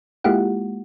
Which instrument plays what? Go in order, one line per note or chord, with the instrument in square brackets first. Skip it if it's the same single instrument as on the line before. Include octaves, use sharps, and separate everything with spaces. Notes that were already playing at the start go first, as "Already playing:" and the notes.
[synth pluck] G#3 A#3 E4 F4 G4 F#5